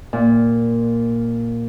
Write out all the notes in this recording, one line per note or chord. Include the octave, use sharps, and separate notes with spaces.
A#2